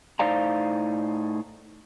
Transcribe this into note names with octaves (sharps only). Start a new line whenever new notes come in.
A2 D#4 C5 D5 F5 A#5